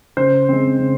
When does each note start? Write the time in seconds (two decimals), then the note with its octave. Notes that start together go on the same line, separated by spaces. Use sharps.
0.17 C#3 C5
0.49 G#3 C4
0.79 C#3